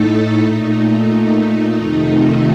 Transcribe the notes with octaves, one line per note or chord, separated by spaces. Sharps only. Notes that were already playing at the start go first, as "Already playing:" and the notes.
Already playing: A2 A3 D#4 A4
A#2 A3 D#4
F2 C3 D#3 A3 D#4